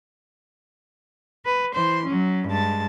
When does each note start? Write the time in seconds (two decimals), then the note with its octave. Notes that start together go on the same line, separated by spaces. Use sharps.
1.45 B4
1.74 E3 C5 C6
2.06 F#3 C#4
2.48 G2 G#3 A5 A6